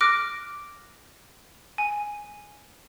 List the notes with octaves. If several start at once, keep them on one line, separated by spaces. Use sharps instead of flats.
D6 F6 F#6 A#6 D7
G#5